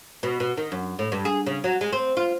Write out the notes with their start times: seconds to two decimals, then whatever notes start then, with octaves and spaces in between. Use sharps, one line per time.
0.23 B2
0.40 B2
0.57 D#3
0.72 F#2
0.99 A2
1.12 G2
1.25 G#4
1.46 C#3
1.64 F#3
1.81 G#3
1.93 C4
2.17 F4